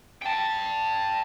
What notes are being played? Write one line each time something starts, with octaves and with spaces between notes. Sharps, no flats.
G5 A5